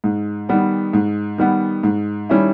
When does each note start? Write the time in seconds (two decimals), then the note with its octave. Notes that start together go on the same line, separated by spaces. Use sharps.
0.04 G#2
0.49 D#3 G3 B3
0.93 G#2
1.38 D#3 G3 B3
1.83 G#2
2.29 D#3 G3 C#4 E4